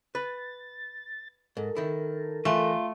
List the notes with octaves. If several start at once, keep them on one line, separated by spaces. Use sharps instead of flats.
B4 A6
G#2 A4 A#4
D#3 E4
E3 A3 F4